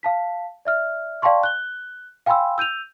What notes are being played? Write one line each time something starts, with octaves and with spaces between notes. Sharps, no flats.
F5 A5 B6
D5 E5 F6
D5 F5 G5 A5 C6 C#6
F#6 G7
F5 G5 G#5 B5 C6 E6
E6 G6 D#7 F7